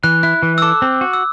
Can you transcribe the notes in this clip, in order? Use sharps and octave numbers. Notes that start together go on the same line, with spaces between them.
E3 F#6
E4 F#6
E3
E6
A4 D6
C4
F#4
E6